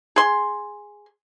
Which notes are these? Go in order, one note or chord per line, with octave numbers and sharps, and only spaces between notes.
G#4 C6